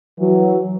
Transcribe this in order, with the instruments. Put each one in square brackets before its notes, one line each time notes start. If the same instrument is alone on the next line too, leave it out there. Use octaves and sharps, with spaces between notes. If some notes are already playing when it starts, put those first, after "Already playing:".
[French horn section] E3 F#3